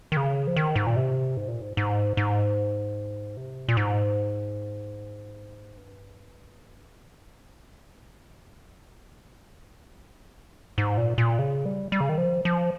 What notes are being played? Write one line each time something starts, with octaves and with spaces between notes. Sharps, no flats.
D#3
C#3
F3
D#3
G#2
A#2
C3
G#2
A#2
G#2
G#2
G#2
C3
A#2
G#2
G2
G#2
A#2
G3
G#3
G3
G#2
G2
G#2
G2
G#2
A#2
A#2
C#3
G3
G3
C#3
D#3
F3
F3